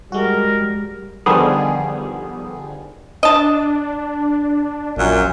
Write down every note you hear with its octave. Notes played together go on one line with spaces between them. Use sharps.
G3 G#3 F#4 A#4
D3 D#3 F3 G3 B3 G#4
D4 D#5 A5
A#1 F#2 A#2